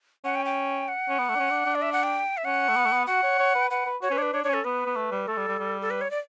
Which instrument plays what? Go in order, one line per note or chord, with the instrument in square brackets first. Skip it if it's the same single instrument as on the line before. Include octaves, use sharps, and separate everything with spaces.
[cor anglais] C#4 [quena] F#5
[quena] G5
G5
F#5
[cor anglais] C#4
B3
A3
D4
C#4
D4
D4
[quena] D5
E5
F#5
G5
E5
[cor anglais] C#4 [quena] F#5
[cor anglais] A3
B3
A3
B3
[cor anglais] F#4 [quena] F#5
[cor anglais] C#5
C#5
B4
[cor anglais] B4 [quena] F#5
[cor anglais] B4
[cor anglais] F#4 [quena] C#5
[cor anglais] C#4 [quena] B4
[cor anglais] D4 [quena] C#5
[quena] B4
[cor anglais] D4 [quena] C#5
[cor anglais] D4 [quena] C#5
[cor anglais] C#4 [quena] A4
[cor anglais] B3 [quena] B4
[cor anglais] B3
A3
G3
[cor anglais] A3 [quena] A4
[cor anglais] G3
G3
G3
[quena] A4
B4
C#5
D5